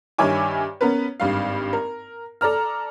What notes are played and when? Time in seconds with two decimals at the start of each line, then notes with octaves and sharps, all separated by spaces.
0.18 G2 D#3 C#5 E5 G#5 D6
0.81 B3 C#4 A#4 B4
1.20 G#1 G2 F5
1.73 A#4
2.41 A4 D5 A#5 F6